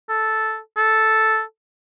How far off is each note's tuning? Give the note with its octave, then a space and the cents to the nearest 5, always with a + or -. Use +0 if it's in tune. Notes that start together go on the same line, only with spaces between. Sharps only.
A4 -5
A4 -5